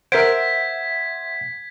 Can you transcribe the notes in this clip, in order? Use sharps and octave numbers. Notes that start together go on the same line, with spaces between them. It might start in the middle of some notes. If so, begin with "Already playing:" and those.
A#4 C5 E5 F#5 G#6 B6 D7